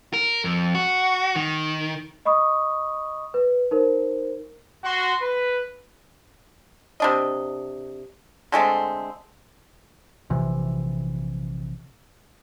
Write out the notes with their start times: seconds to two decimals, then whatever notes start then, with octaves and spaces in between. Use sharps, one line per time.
0.13 A#4
0.44 F2
0.75 F#4
1.35 D#3
2.25 D#5 B5 C#6 D#6
3.34 B4
3.71 D#4 A#4 C5
4.84 F#4 C6
5.22 B4
7.00 C3 D4 D#5
8.52 D3 G#3 A3 C4
10.30 A#1 C3 E3